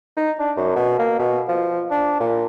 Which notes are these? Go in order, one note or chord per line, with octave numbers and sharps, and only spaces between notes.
D#4
D4
F#2
B2
A#3
B2
F3
D4
A#2